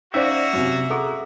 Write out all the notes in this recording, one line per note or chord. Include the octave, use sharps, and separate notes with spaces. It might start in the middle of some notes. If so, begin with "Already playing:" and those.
A#3 C#4 D#4 F#4 C5 D5 E5 F5
F#2 C3
G#4 A4 F#5 A#5 C#6